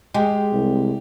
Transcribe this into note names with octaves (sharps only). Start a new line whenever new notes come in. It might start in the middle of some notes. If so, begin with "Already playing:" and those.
G#3 G4
C2